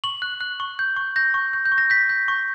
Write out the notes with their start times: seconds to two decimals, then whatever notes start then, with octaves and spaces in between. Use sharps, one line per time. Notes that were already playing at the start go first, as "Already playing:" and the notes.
0.04 C#6 F#7
0.22 F#6
0.41 F#6
0.60 C#6
0.79 G6
0.96 C#6
1.16 G6 A#6
1.34 C#6
1.53 G6
1.65 G6
1.72 C#6
1.78 A#6
1.90 G6 B6
2.09 G6
2.28 C#6